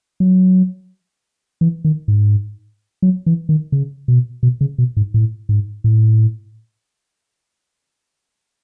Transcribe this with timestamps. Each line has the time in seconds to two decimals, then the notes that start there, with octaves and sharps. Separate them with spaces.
0.20 F#3
1.61 E3
1.85 D#3
2.08 G#2
3.02 F#3
3.26 E3
3.49 D#3
3.72 C#3
4.08 B2
4.43 B2
4.61 C#3
4.78 B2
4.97 G#2
5.14 A2
5.49 G#2
5.84 A2